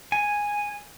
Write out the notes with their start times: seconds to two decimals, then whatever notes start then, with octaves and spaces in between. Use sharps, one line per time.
0.12 G#5